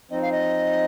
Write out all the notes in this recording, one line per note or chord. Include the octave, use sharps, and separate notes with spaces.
F3 C4 D#4 D#5
F5
D#5